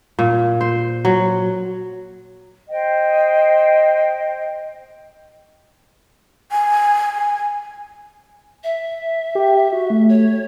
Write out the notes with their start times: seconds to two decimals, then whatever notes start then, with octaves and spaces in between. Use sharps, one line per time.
0.19 A#2
0.61 C5
1.05 F#3
2.68 C5 D#5 G5
6.52 G#5
8.64 E5
9.35 G4
9.73 F#4
9.90 A3
10.09 C#5